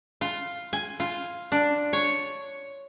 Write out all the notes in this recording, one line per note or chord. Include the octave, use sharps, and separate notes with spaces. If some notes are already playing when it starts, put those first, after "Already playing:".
F4
G#5
F4
D4
C#5